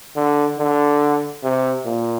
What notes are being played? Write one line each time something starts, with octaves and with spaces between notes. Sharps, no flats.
D3
D3
C3
A#2